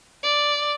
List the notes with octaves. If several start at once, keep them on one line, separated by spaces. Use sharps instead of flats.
D5